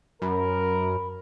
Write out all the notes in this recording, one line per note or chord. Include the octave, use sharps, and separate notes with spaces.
F#2 A#4 B5